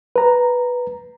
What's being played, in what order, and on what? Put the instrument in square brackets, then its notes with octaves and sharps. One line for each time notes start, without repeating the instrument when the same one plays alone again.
[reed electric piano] B4 A#5